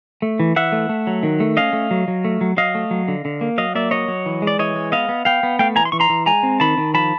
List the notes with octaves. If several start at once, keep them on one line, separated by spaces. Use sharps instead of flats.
A3
E3
E3 E5 F#5
A3
A3
F#3
D#3
A3
C#4 D#5 F5
A3
F#3
F#3
A3
F#3
F#3 D#5 F5
A3
F#3
D3
D3
A#3
F#3 D#5 F5
A#3 D5 E5
F#3 C#5 D#5
F#3
E3
G#3
D5
E3 C#5 D#5
G#3
B3 D#5 F5
B3
B3 F5 G5
B3
A3 F5 G5
E3 G#5 A#5
C6
E3 C#6
A#5 C6
E3
G#3 G#5 A#5
C4
D#3 A5 B5
D#3
F3 A5 B5